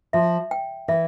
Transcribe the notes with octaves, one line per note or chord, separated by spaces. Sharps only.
F3 E5
G5
E3 E5